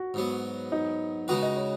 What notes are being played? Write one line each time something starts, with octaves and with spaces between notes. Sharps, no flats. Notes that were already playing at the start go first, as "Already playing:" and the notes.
Already playing: F#4
G#2 F#3 B3
D#4
C#3 G#3 D#4 F#4 B4
D#5
C#5